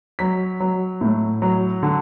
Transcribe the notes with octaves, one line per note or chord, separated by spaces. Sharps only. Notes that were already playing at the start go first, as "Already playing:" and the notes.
F#3 B6
F#3
A2
F#3
D3